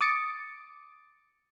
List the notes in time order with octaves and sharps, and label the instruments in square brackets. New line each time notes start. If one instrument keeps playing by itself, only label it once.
[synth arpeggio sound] D6 D#6 A6 C#7 D7